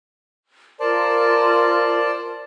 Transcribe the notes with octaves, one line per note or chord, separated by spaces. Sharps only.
F4 A#4 C5 D5 A5